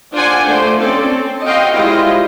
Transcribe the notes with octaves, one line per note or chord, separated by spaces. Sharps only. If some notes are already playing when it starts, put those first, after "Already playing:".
D4 F4 C5 D5 F#5 G#5
F3 A3 C5 D5
C4 C#4 A4 D5
C4
F#4 D#5 F5 G5 C6
G3 G#3 E4 F4 C5 D#5